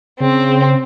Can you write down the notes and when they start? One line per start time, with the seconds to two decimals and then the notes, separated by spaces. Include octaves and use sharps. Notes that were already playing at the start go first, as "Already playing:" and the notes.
0.20 C#3 C4